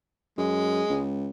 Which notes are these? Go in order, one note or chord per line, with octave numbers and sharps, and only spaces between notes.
F#2 G#3
C#2